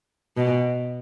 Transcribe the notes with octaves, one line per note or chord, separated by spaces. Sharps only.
B2